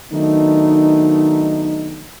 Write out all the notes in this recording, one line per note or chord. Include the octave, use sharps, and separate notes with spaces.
D#3 F#3 A3 B3 D4 D#4